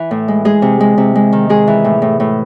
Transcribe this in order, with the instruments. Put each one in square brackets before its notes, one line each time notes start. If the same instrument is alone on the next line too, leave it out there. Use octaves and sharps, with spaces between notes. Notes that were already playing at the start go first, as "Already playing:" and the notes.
Already playing: [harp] E3
A2
G#3
G#3 G#4
C3
G#3
C3
G#3
D#3
G#3 G#4
E3
A2
A2
A2